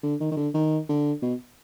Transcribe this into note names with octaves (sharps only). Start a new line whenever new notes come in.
D3
D#3
D#3
D3
D#3
D3
B2